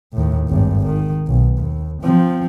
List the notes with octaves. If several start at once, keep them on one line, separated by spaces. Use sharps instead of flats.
D#2 A2
G#1 G2
D#3
B1
D#2
F3 C4